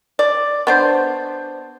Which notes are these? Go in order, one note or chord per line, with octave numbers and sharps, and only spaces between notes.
D5
B3 D4 C5